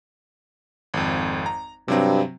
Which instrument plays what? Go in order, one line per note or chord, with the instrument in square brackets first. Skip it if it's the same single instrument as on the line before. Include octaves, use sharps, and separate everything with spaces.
[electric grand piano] G#1 F2
A#5
[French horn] G2 [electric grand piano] C3 F#3 C4